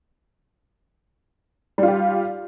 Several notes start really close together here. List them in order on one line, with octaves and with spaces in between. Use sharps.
G3 F4 G4